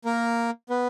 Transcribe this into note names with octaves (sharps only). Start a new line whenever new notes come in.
A#3 A#4
B3 B4